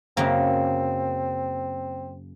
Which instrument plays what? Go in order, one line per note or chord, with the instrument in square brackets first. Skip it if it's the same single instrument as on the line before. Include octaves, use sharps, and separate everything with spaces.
[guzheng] F#2 C#3 A#3 [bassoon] C4